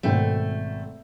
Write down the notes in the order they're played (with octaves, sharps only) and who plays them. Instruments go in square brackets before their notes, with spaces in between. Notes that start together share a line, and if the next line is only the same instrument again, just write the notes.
[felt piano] G#1 B2 G5 [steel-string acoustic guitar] A3